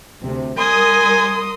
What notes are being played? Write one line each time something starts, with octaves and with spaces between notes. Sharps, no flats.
D2 C3
G3 A#4 G#5 C6 D#6